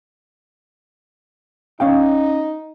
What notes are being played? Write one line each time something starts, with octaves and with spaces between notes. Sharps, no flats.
C#4 D#4 F5 G5